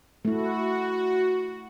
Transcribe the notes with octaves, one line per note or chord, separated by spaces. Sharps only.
A3 E4 F#4